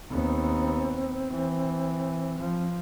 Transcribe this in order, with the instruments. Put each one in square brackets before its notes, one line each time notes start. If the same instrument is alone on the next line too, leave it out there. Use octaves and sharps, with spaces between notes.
[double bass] D#2 B3 [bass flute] C4
[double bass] E3
F3